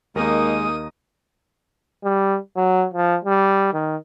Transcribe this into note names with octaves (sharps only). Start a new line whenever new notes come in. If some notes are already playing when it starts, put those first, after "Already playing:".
D#2 G#3 A#3 D#4 A#4 D#6 A#6
G3
F#3
F3
G3
D#3